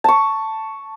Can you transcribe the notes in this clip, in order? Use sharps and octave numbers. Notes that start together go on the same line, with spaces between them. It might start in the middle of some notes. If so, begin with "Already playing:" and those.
A5 C#6